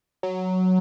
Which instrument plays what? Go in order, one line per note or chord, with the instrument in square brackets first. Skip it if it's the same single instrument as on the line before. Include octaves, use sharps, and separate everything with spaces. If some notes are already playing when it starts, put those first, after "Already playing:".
[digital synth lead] F#3